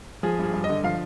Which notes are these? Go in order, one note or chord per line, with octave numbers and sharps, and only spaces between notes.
F3 G#4
G2 G#4
G2
D#5
D3
F3 F5